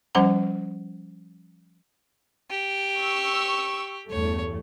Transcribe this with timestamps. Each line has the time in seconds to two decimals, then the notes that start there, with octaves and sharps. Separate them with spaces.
0.15 F3 G3 C#4 C5 F#5 A#5
2.51 G4
2.99 C#6 E6
4.10 E2 G2 A3 C#5